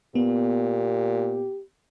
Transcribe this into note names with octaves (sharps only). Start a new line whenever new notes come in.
A#2 B3 G4